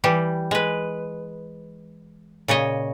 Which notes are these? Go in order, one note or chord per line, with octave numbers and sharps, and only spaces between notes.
E3 G3 G4
G#3 B4
A#2 C#3 C#5 D#5